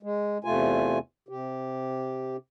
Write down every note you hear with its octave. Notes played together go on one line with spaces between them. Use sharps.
G#3
E2 C3 A3 F4 G#5
C3 G4